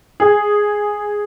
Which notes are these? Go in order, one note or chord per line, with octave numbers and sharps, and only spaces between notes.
G#4